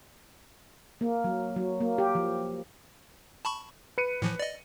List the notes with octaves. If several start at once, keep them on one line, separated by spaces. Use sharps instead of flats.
A#3
F#3
F#3
A#3
G4
F3
A5 B5 C#6
B4 C#7 D#7
A2 E3 F3
D5 D#5